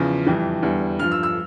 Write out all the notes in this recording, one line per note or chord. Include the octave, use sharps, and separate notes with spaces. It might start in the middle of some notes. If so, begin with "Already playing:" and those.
Already playing: E2 C#3 F3
F2 E3 G3
E2 D3 G3
G2 F3 F6
E6
E6